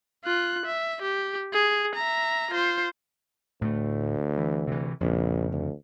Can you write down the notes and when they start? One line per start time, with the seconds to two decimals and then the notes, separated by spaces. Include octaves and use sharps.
0.24 F4 F#6
0.65 E5
1.02 G4
1.53 G#4
1.95 E5 A#5
2.52 F4 C5
3.61 D2 A2 A3
4.37 E3
4.67 C3 E3
5.01 A#1 F2 C#3
5.52 D2